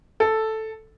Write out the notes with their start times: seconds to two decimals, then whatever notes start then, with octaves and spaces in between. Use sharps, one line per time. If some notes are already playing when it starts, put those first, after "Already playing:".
0.20 A4